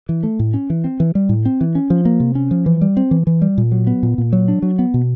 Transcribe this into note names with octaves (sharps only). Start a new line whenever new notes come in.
E3
A3
A2
C#4
E3
C4
E3
G3
A2
C4
E3
C#4
F3
A#3
C3
C#4
F3
E3
G3
C4
E3
E3
G3
A#2
F#3
B3
A#2
A#2
F#3
D4
F#3
B3
B2